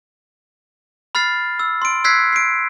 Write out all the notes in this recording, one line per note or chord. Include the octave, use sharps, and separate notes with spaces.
B5 F6 A6 C7
E6
C6 D7
E6 F#6 G#6 B6 C7
C7 D7